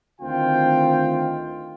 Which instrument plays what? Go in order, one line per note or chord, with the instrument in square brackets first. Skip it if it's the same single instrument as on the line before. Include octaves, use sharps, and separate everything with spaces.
[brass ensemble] D2 D#3 C4 F4 G5